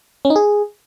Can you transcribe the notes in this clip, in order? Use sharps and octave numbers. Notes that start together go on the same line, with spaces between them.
C#4
D#4
G#4